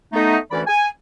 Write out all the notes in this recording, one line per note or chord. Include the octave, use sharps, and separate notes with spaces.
A3 B3 D#4
D2 E3 A3 C#4 D5 B5
G#5